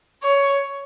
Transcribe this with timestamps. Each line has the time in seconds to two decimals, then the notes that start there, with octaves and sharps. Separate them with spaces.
0.23 C#5